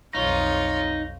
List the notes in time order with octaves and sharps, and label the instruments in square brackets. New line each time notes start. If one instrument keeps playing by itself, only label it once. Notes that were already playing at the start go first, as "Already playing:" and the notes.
[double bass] B1 F2 [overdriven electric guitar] D#4 [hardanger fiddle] F4 C#5